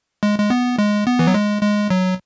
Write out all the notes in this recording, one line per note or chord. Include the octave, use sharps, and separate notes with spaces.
G#3
G#3
B3
G#3
B3
E3
F#3
G#3
G#3
F#3